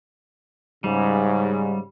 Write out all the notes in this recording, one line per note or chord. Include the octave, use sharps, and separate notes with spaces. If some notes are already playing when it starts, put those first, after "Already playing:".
G#2 C#3 G3